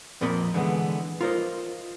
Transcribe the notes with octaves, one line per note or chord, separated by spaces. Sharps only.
F2 A#2 C4 A#4 D#5 B5
D3 E3 G#3 B3
F4 A#4 C5 D#5